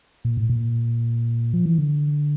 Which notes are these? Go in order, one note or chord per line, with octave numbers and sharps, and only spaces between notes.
A#2
A2
A#2
F3
E3
D3